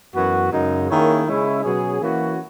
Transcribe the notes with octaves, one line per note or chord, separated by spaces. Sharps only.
F#2 E3 B3 F#4
F#2 C#3 G#3 D#4
D#3 A#3 C#4 E4 G#4
C#3 G#3 C#4 E4
B2 F#3 C#4 G#4
E3 A#3 C#4 F#4